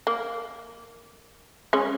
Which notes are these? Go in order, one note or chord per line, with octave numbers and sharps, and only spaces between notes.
A#3
G#3 C#4